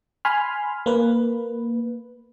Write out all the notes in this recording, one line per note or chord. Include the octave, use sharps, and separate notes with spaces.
G#5 B5 C6 F6
A#3 B4